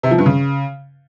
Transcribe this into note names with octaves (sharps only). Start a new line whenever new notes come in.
C3
F3
G2
C#3